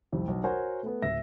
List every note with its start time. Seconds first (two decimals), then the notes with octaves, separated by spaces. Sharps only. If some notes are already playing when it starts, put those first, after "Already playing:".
0.12 C2 F2
0.28 B1
0.44 F#4 A#4 C5 C#5 F#5 G#5
0.83 A3 B3
1.02 D1 E5 A#6